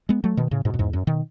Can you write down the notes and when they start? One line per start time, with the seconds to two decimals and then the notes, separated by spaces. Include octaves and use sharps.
0.09 G#3 B3
0.24 F#3 A3
0.37 B2 D#3
0.51 A2 C#3
0.65 G#2 B2
0.74 F#2
0.79 E2 G#2
0.93 F#2
1.07 B2 D#3